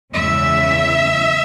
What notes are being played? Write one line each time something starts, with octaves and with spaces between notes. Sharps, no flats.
E2 C#3 E3 G#3 E5